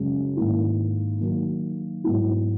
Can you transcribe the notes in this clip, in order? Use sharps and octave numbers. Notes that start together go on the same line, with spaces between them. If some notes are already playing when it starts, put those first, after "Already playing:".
Already playing: F#2 C#3 G#3
G#2 D#3 A#3 E4
D#3 F#3 A#3
G#2 F#3 B3 E4